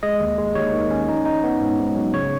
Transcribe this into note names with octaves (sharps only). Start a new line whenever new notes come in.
G#3 D#5
D#2
G#3
D#2 C#5
D#3
C#4
D#4
D#4
B3
G#2
G#2
F#3
C#3 C#5